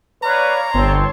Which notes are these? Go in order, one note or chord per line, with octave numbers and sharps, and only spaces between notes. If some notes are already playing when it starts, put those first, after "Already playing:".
B4 C#5 D5 F5 A#5
G1 C4 C#5 A5 C6